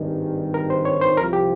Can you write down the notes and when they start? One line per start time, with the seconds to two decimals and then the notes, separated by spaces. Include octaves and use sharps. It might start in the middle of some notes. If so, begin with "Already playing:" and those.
Already playing: G#1 G2 D#3 G3
0.54 A#4
0.70 C5
0.85 C#5
1.01 C5
1.17 C2 C3 F3 A#4
1.33 G4